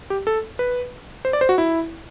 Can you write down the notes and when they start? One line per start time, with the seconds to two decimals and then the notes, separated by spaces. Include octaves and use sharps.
0.10 G4
0.27 A4
0.59 B4
1.25 C5
1.33 D5
1.41 C5
1.49 F#4
1.58 E4